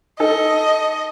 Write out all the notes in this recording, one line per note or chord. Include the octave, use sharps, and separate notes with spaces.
D#4 A4 D#5